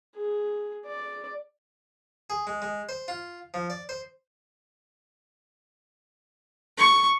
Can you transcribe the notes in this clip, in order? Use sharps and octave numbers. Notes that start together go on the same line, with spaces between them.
G#4
D5
G#4
G#3
G#3
C5
F4
F3
D5
C5
C#6